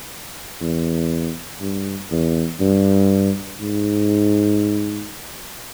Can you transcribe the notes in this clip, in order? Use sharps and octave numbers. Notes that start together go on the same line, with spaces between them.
E2
G2
E2
G2
G#2